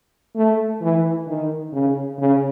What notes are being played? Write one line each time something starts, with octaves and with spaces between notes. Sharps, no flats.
A3
E3
D#3
C#3
C#3